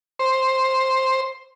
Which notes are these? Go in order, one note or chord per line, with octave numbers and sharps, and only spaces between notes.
C5